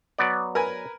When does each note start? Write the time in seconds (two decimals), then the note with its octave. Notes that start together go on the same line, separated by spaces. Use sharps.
0.18 F#3 B3 D5
0.55 A#4 B4 G#5